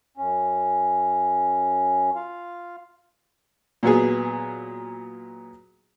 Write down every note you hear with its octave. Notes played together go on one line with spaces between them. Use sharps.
F#2 C#4
F4 F5
A#2 F#3 B3 G#4